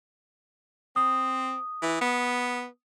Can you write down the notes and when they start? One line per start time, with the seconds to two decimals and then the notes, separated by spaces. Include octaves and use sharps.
0.96 C4 D#6
1.82 E3
2.01 B3